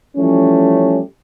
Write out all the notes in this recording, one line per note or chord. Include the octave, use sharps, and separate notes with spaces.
E3 F3 G3 A3 C#4